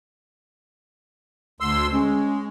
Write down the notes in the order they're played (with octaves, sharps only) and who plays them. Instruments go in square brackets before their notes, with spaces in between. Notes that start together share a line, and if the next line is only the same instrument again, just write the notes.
[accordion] D2 C6 E6
[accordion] G#3 [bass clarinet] C#4